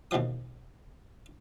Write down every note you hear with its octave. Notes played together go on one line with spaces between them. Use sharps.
D#2 B2 E3 F3 D#6